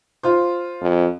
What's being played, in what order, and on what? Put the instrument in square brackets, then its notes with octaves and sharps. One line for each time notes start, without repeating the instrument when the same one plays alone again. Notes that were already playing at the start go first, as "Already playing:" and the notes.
[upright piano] F4 C5
[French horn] F2